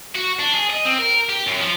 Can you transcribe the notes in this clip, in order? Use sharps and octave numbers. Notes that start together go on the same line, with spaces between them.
F#4
D4
G#4
D#5
C4
A#4
G4
F#2
F3